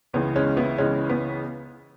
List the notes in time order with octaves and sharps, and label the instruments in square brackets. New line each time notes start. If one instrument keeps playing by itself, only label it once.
[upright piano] C#2 C#3 E3 B3
G#3 C#4
B3 E4
C#2 C#3 E3 G#3 C#4
B3